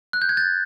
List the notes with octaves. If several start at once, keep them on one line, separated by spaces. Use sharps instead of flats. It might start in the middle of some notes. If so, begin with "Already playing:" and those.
F#6
G6
G#6
G6 A6